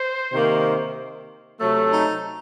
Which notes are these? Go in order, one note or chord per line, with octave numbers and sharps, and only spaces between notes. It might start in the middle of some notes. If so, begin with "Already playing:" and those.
Already playing: C5
C3 D#3 A#3
C3 F#3 A3
D#4